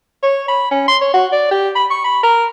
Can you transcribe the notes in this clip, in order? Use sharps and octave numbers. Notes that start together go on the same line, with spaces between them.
C#5
B5
C#4
C6
C#5
F#4
D5
G4
B5
C#6
B5
A#4